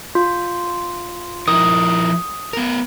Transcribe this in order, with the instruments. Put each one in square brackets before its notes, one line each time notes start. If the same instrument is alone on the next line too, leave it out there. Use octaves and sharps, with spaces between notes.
[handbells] F4
[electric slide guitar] F3 E4 A#4 [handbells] D#6
[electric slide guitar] B3 A#4